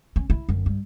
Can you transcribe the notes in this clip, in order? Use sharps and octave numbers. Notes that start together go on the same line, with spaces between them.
C#4
E4
G1 F#2
G2